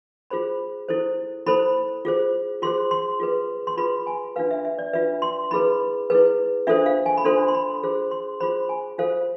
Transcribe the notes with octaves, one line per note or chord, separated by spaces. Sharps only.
F4 G#4 C5 B5
E4 A4 C5
E4 A4 C5 B5
F4 G#4 C5
F4 G#4 C5 C6
C6
F4 G#4 B4
C6
F4 G#4 B4 B5
G#5
D4 F4 B4 F5
E5
E5
D5
D4 F4 B4 E5
C6
E4 G#4 B4 B5
E4 G#4 B4
D4 F4 A4 C5 E5
F5
G#5
B5
D4 F4 A4 C5 C6
C6
B5
F4 G#4 C5
C6
F4 G#4 C5 B5
G#5
F4 A4 C5 F5